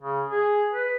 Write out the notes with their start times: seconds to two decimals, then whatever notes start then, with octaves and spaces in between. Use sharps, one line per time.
0.01 C#3
0.30 G#4
0.73 B4